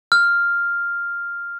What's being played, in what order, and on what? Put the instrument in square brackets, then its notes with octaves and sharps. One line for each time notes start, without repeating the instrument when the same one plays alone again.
[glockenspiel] F6